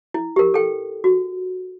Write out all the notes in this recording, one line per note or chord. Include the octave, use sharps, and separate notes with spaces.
E4
G4 A#4
A4 G5
F#4